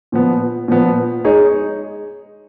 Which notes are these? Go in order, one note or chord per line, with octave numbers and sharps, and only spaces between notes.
A#2 F3 B3
A#2 F3 B3
G#3 D#4 G#4 C#5